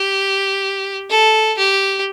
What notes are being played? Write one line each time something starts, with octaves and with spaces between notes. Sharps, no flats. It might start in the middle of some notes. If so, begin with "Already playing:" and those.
Already playing: G4
A4
G4